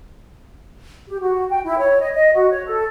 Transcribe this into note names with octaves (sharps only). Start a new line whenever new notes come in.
G4
F#4
G5
E4
C#5
D#5
D#5
F#4
C#5
A4